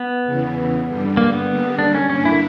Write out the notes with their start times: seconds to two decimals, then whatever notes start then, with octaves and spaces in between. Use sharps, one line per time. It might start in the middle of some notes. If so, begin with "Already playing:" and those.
Already playing: B3
0.24 E2 C#3 E3
0.86 G2 D3 G3
1.17 A#3
1.33 B3
1.48 D3 G3 A#3
1.79 D4
1.95 C#4
2.10 G2 D3 A#3 C#4 D4
2.25 E4